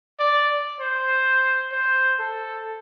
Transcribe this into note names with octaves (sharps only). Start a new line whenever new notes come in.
D5
C5
C5
A4